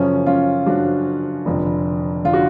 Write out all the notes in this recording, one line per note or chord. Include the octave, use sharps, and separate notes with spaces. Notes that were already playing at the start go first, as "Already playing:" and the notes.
Already playing: F#2 C#3 F3 C#4
C#4 F4
F#2 C#3 F3 D4 F#4
F1 F2 D3
D3 F4
F#4